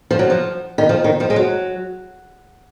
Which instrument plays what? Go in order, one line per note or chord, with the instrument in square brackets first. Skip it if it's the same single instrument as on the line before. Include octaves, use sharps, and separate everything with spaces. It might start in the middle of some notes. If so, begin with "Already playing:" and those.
[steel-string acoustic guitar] F3
F#3
F3
D#3
F3
D#3
F3
G#3
F#3